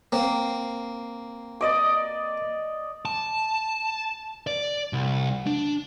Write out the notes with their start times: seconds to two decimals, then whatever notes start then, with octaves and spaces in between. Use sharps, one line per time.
0.12 A#3 C4
1.61 D5 D#5 D6
3.05 A5
4.47 D5
4.93 C2
5.47 D4